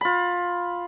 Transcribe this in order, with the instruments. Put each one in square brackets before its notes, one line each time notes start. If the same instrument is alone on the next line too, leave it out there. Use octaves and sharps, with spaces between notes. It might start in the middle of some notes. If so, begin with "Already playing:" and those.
[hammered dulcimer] F4 B5